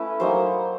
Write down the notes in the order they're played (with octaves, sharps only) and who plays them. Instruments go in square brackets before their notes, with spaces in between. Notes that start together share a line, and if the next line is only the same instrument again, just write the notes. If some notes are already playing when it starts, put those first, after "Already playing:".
Already playing: [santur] A3 C#4 E4 B4
F#3 A#3 D#4 C5